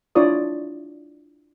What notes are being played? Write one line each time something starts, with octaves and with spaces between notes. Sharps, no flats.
D4 E4 F4 C#5 D5 D#6